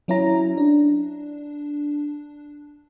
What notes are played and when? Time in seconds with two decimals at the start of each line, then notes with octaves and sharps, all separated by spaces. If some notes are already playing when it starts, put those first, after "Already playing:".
0.08 F#3 C#4 E4 A#5
0.57 D4